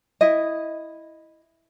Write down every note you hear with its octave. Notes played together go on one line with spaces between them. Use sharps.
E4 D#5